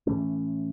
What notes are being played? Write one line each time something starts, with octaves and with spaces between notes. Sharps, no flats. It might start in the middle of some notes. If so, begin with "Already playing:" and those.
A2 E3 A3 C#4